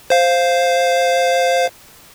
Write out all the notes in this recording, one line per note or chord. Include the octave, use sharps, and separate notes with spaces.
C5 F5